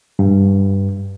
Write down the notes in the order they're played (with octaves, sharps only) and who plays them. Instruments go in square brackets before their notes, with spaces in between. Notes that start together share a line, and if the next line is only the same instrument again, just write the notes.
[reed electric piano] G2